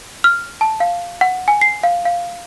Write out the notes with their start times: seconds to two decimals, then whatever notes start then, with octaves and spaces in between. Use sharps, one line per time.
0.24 F6
0.61 A5
0.80 F5
1.21 F#5
1.48 G#5
1.61 C7
1.83 F5
2.05 F5